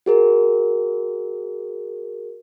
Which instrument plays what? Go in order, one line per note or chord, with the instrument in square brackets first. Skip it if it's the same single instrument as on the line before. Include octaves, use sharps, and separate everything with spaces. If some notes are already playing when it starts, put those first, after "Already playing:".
[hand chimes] F#4 G#4 A#4